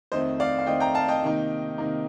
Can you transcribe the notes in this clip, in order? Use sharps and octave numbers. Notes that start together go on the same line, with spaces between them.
F2 D#3 A3 C4 C5 D#5
D5 F5
F5
F2 D#3 A3 C4 D#5 G5
G5 A#5
F5 A5
D#5 G5
C3 D#3 A#3 D#4
C3 D#3 A#3 D#4